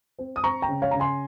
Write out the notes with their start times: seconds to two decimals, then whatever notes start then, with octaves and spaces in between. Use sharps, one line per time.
0.19 C4
0.36 D#6
0.44 C4 A#5 C#6
0.62 G5 A#5
0.69 C#3
0.82 C#5 F5
0.91 C#3 A#5
1.00 G#5 C6